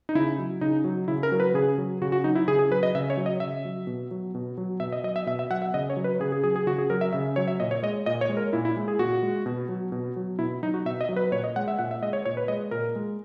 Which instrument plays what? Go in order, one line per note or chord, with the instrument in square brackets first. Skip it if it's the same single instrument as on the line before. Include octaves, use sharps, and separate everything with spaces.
[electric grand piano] D#4
C#3 E4
F#3
C#3 D#4
F#3
C#3 E4
A#4
F#3
B4
C#3 G#4
F#3
C#3 F#4
F#4
F#3 D#4
E4
C#3 G#4
G#4
F#3 B4
D#5
C#3 E5
C#5
F#3
D#5
C#3 E5
F#3
B2
F#3
B2
F#3
B2 E5
D#5
F#3 D#5
E5
B2 E5
E5
F#3 F#5
E5
C#3 D#5
C#5
F#3
B4
C#3 G#4
G#4
F#3 G#4
G#4
C#3 F#4
G#4
F#3 A#4
E5
C#3 E5
F#3 C#5
E5
A#2 D#5
C#5
G#3 D#5
A#2 D#5
C#5
G#3
A#4
A#2 E4
E4
G#3
G#4
A#2 F#4
G#3
B2
F#3
B2
F#3
B2 E4
F#3 D#4
F#4
B2 E5
D#5
F#3
B4
A#2 C#5
D#5
G#3 F#5
E5
A#2 F#5
E5
G#3 D#5
C#5
A#2 C#5
B4
G#3 D#5
A#2 A#4
G#3